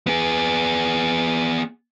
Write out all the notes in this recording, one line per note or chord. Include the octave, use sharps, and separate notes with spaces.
B3 G#4